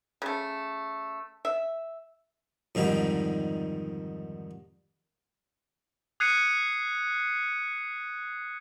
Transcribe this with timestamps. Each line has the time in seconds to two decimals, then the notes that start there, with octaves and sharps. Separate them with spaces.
0.22 C#3 A3
1.45 E5
2.75 F2 G#2 D3 D#3 G3
6.20 D#6 F#6 G#6 C7 C#7 D#7